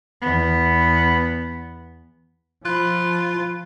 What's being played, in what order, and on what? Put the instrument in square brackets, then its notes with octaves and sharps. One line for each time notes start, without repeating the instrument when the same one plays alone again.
[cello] E2 B3
[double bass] F3 [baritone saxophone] F4 [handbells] B5 F#6